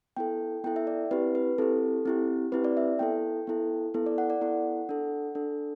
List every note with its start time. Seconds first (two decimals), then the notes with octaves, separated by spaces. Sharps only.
0.17 B3 E4 A4 G5
0.64 B3 E4 A4 G5
0.76 E5
0.87 D5
1.11 C4 E4 G4 B4
1.35 B4
1.58 C4 E4 G4 A4
2.06 C4 E4 G4
2.52 C4 E4 G4 B4
2.64 D5
2.77 E5
2.99 B3 E4 A4 G5
3.47 B3 E4 A4
3.94 B3 E4 A4
4.06 D5
4.18 F#5
4.30 D5
4.41 B3 E4 A4 F#5
4.89 D4 A4
5.35 D4 A4